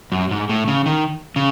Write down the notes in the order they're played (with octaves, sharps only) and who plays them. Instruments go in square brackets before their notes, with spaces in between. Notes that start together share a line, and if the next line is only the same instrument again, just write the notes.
[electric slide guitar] F#2
G#2
A2
C#3
D#3
C#3